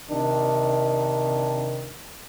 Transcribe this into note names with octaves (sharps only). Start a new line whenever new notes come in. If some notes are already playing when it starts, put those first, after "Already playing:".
C3 D#3 D4